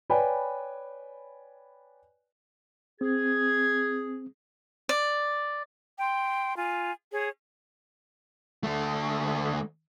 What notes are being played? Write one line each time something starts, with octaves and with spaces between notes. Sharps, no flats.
B4 C#5 D5 G5 G#5 B5
C4 G#4 G#6
D5
G5 C6
F4 G#5
G#4 C#5
D2 A3